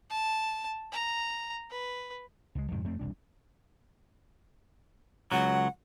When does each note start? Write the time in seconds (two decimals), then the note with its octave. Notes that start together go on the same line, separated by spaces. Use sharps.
0.10 A5
0.92 A#5
1.70 B4
2.55 C#2 G#3
2.72 F2 G#2 C3 D#3
2.84 F2 A3 C4
2.99 E1 C2 D4
5.32 C#2 F#3 F#5